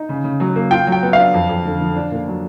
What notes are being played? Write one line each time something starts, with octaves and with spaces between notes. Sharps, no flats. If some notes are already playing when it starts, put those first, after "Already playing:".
Already playing: D#4
C#3
C#3
F#3
A#3
F4 G5
F#3
G5
B3
D4 F5
F2
F2
D3
F3
D4
A#2
F#3